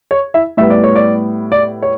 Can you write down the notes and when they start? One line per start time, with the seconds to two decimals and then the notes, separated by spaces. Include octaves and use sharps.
0.11 C#5
0.34 E4 E5
0.57 A2 G3 B3 E5
0.70 D5
0.84 C#5
0.95 D5
1.52 D5
1.83 C#5